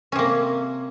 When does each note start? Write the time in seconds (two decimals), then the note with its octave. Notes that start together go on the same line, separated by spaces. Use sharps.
0.12 C#4
0.15 C3
0.19 A#3